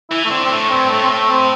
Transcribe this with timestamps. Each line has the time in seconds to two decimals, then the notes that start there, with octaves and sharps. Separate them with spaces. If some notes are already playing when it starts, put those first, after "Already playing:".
0.10 E3 E4
0.25 A3
0.30 D3 C4
0.45 C4
0.50 A2 A3
0.70 G2 C4
0.90 A2 A3
1.03 C4
1.10 A3
1.29 C4